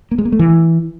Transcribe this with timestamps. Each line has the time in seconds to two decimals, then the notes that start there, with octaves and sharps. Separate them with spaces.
0.11 A#3
0.18 G#3
0.25 A#3
0.32 A3
0.39 E3